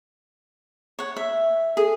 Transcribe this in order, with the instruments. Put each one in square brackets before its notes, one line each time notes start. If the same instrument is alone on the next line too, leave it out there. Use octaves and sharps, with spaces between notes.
[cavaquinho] C#5 F#5
E5
[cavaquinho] G#4 [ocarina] A4